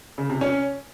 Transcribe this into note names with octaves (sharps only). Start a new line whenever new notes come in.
C#3
C3
C#4